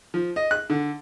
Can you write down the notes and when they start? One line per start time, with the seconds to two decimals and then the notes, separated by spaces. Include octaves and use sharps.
0.14 F3
0.36 D#5
0.51 F#6
0.70 D3